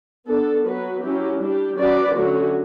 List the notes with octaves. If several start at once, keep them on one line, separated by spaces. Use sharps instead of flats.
B3 D4 A4
F#3 B3 F#4 B4
F#3 C#4 E4 G4
G3 D4 G4
F#3 C#4 F#4 B4 D5
D3 F#3 A3 C#4 F#4